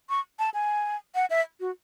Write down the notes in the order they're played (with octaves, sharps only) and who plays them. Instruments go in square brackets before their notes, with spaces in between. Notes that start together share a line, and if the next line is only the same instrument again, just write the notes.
[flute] C#6
A5
G#5
F#5
E5
F#4